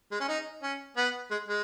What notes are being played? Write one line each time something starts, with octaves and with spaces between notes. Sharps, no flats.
G#3
C#4
D#4
C#4
B3
G#3
G#3